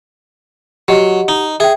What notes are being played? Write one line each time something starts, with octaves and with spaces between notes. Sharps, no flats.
F#3 G4 D#5 F#5
D#4
G#4 E5 G5